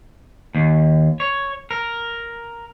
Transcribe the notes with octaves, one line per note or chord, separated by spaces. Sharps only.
D#2
C#5
A#4